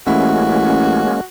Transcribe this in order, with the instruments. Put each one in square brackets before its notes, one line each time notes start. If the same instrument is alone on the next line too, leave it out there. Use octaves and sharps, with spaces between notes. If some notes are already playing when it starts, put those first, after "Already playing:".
[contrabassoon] A1 [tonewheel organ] G#3 A#3 C#4 [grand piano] E4 [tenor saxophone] F#4